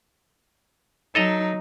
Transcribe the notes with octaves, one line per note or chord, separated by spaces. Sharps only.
F#3 D#4 A4 D#5 A#5